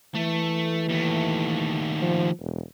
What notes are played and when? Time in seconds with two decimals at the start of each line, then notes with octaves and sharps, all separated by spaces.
0.15 E3 A3
0.89 D#2 A3
2.02 F3
2.40 E1